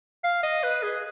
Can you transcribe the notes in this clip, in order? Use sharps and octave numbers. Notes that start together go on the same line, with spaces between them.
F5
D#5
B4
G#4